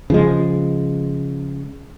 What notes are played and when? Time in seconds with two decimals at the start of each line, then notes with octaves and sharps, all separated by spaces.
0.10 C#3 F3 G#3